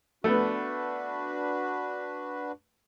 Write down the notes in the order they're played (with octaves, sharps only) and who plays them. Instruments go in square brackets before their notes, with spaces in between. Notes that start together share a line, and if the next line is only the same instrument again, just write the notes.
[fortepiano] A3 B3 [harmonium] D4 F#4 B4